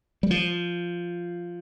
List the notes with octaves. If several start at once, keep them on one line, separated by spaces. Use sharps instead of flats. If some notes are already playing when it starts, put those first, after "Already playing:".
G3
F3